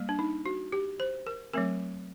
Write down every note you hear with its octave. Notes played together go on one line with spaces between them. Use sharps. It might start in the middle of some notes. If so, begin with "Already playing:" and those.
Already playing: G3 A#3
D4
D#4
F#4
G4
C5
A#4
F#3 A3 C4 A#4